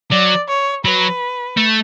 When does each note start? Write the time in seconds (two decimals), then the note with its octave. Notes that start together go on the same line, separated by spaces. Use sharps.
0.12 F#3 D5
0.49 C#5
0.85 F#3 B4
1.57 A3